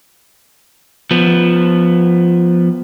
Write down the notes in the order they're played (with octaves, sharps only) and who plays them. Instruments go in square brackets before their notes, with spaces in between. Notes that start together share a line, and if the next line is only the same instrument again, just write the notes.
[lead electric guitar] F3 B3